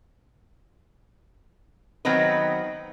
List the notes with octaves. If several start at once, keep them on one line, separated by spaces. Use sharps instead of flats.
D#3 F#3 B3 C4 D#4 B4